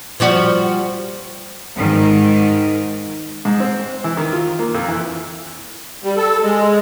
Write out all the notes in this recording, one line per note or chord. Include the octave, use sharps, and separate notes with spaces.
F3 G3 F#4
G#2 D#3
G#2
C4
E3
D#3
F4
A#3
F2
E3
G3
A4
G#3